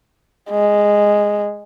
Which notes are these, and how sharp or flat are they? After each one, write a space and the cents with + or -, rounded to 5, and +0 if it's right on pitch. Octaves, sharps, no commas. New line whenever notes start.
G#3 -5